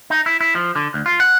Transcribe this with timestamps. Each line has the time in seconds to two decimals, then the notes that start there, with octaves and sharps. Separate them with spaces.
0.10 D#4
0.26 E4
0.41 E4
0.55 F3
0.76 D3
0.94 D2
1.06 F4
1.20 F#5